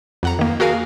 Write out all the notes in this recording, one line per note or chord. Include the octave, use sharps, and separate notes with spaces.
F2 F#5 A#5
D#3 A#3
F#4 G#4 A#4 F5 G#5